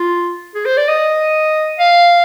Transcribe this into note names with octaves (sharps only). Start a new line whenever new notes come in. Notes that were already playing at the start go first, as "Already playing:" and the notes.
Already playing: F4
G#4
C5
D5
D#5
F5